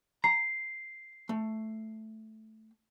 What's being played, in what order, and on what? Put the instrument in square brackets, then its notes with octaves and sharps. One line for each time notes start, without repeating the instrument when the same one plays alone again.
[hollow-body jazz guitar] A#5 [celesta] C7
[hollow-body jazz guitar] A3